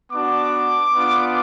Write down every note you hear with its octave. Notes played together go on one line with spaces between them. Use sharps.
B3 D4 F#4 D6
B3 D4 F4